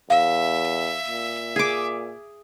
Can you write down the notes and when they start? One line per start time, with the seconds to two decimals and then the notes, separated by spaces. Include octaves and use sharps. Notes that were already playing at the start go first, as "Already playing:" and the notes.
0.10 E2 E5 F5
1.07 A#2
1.56 G#4 D6